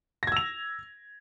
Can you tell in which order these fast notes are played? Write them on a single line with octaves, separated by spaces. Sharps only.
A#6 G#6 E6 F7